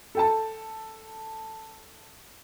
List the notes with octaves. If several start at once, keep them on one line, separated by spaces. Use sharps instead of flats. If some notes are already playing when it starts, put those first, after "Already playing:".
A4 G5 A5